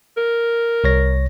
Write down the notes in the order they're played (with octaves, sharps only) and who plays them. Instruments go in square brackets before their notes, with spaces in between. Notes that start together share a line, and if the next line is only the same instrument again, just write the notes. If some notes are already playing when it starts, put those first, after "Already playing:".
[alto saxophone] A#4
[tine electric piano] C2 C#5 A#6